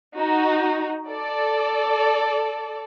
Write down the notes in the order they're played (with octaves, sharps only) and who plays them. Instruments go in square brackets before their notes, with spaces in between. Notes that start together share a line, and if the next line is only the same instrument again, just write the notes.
[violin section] D#4 F#4
A4 D5